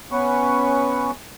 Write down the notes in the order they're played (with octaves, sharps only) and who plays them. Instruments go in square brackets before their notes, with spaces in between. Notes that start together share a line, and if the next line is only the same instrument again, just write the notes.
[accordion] B3 C#4 B4 C#6